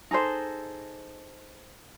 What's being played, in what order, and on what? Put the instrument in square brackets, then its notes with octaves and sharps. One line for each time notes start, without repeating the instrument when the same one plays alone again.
[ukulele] D#4 G#4 A4 C5